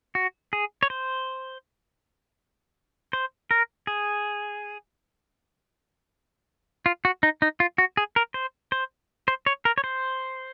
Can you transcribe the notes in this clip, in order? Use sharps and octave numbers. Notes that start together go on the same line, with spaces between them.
F#4
G#4
C#5
C5
C5
A#4
G#4
F4
F#4
D#4
D#4
F4
F#4
G#4
A#4
C5
C5
C5
C#5
A#4
C#5
C5